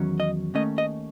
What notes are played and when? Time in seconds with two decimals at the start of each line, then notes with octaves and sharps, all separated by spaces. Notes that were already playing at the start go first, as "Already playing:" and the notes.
Already playing: E2 D#3 F#3 C#4
0.20 D#5
0.54 D#2 D#3 A3 C#4 D#5
0.78 D#5